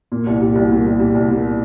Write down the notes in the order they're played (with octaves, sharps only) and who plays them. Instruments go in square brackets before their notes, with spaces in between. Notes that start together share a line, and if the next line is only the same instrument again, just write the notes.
[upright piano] A#2
C2
G3
C2
A#2
C2
G3
C2
A#2